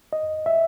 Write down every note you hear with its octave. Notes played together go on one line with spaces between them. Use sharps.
D#5
E5